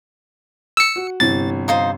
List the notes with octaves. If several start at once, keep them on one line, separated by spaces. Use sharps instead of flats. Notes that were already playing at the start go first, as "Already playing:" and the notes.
E6 C#7
F#4
G1 C3 E3 A6
D#4 F4 C5